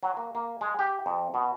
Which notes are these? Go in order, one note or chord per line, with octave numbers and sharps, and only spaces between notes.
F#3
A#3
A#3
G#3
G4
F2
B2